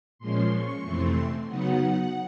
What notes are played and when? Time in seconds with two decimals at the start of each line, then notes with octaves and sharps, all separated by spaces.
0.18 A#2 F3 G#3 C#4 C6
0.51 C#6
0.83 F2 C3 E3 A3 C4 C6
1.47 C#3 F#3 B3 D#4 F#5